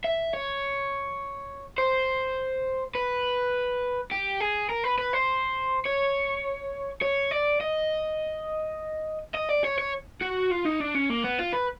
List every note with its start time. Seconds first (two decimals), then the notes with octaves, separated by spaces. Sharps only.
0.04 E5
0.33 C#5
1.78 C5
2.95 B4
4.11 G4
4.40 G#4
4.69 A#4
4.84 B4
4.98 B4
5.13 C5
5.85 C#5
7.02 C#5
7.31 D5
7.61 D#5
9.35 D#5
9.50 D5
9.65 C#5
9.78 C#5
10.22 F#4
10.51 F4
10.66 D#4
10.81 D4
10.95 C#4
11.10 A#3
11.24 B3
11.39 F4
11.53 B4